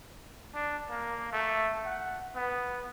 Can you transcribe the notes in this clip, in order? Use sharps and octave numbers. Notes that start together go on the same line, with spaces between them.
D4
A#3
A3
F#5
B3